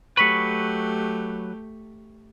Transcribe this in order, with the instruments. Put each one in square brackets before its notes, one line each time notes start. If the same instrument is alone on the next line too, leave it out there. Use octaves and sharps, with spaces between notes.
[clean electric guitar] F#3 B4 [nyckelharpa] A3 G4 [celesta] C#6 B6 C#7